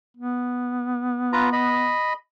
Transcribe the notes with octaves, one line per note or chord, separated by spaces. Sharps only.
B3
F4 B4 A#5
D#5 B5